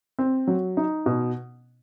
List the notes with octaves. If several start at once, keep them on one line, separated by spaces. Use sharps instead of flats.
C4
F#3
D#4
B2